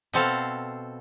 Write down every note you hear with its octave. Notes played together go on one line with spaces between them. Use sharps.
B2 C4 A4 F5